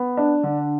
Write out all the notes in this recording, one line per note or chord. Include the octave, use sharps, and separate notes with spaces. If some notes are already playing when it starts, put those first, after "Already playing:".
Already playing: B3
D4
D3